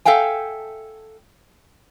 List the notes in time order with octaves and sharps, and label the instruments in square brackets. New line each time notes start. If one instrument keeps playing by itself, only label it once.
[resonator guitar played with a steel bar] A4 E5 F5 G5 G#5